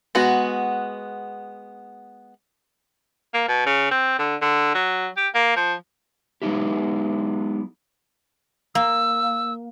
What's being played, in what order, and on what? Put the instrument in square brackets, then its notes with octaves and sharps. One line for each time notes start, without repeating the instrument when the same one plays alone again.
[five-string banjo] G#3 B3 F#4
[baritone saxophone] A#3
B2
C#3
C4
D3
D3
F#3
G4
A#3
F3
[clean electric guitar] F#3 G#3 B3 D#4 E4 G4
[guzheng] A#3 [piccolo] E6